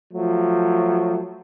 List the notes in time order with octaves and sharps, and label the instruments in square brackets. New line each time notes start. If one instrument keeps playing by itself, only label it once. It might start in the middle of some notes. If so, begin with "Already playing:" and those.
[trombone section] F3 F#3 A3